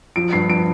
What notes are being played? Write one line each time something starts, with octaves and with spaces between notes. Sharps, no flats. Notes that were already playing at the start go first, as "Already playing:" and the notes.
F3 D7
G2 C7
F3 D7